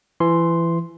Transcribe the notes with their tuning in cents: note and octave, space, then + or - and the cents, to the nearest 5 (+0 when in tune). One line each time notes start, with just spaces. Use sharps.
E3 +25 C6 +0